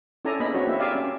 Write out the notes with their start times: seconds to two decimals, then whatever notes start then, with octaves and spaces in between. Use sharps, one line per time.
0.25 C#4 E4 A4 D5 G#5 A#5
0.40 A#3 B3 D4 G#4 D#5 B5
0.53 C4 F#4 C#5
0.67 A#3 E4 C#5 E5
0.79 G4 D5 E5 F5 G#5
0.95 C#4